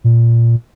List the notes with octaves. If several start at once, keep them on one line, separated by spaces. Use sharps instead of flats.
A#2